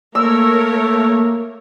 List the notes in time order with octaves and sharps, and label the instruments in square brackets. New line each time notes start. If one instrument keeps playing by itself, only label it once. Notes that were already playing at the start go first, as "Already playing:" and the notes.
[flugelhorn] A3 [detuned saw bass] A#3 [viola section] A#4 C#5 [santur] E6